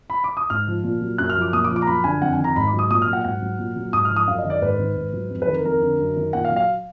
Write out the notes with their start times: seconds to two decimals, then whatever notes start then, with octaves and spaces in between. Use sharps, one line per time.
0.10 B5
0.24 D6
0.37 D#6
0.50 G#2 F6
0.67 F3
0.84 A#2
1.01 F#3
1.18 F#2 F#6
1.30 F6
1.36 F3
1.41 D6
1.53 A#2 D#6
1.65 D6
1.70 F3
1.76 D6
1.82 A#5
1.87 F#2 B5
2.04 D3 G#5
2.21 F2 F#5
2.33 G#5
2.38 D#3
2.44 A#5
2.56 G#2 B5
2.67 D6
2.73 F#3
2.79 D#6
2.90 A#2 D#6
3.02 F6
3.07 F#3
3.13 F#5
3.24 G#2 F#5
3.42 F#3
3.59 A#2
3.76 F#3
3.93 G#2 D#6
4.05 F6
4.10 F3
4.16 D#6
4.27 F#2 F5
4.38 D#5
4.44 D#3
4.50 D5
4.61 G#2 B4
4.79 D#3
4.96 G#2
5.13 F#3
5.30 F2
5.42 B4
5.47 D#3
5.54 A#4
5.64 F2 A#4
5.82 D3
5.99 F#2
6.16 D#3
6.33 A#2 F#5
6.44 F5
6.51 F#3
6.56 F5